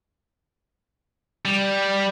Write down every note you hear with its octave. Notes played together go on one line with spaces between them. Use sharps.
G3